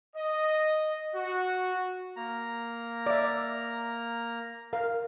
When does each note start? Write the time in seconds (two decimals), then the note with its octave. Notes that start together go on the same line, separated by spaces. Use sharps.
0.15 D#5
1.15 F#4
2.16 A#3 A#5
3.06 D5 E5
4.73 A#4 F5